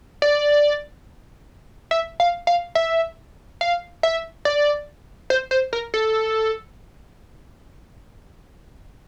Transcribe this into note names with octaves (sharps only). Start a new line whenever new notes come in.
D5
E5
F5
F5
E5
F5
E5
D5
C5
C5
A#4
A4